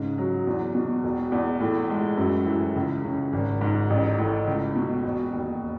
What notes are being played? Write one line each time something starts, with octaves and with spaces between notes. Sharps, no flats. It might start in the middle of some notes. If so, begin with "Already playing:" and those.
Already playing: G#2 C#3
F#3
E2
B2
E1
E2
A2
G#3
F#2
E3
C#2
C#3
G#1
G#2
A1
A2
C#2
B2
E1
D#2